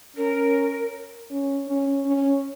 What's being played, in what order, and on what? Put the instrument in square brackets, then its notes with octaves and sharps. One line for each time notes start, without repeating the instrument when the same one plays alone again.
[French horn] C#4 [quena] A#4
[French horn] C#4
C#4
C#4